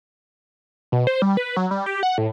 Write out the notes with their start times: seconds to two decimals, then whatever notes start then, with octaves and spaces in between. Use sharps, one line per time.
0.92 B2
1.07 C5
1.22 G3
1.37 B4
1.57 F#3
1.71 G3
1.86 G4
2.03 F#5
2.18 A2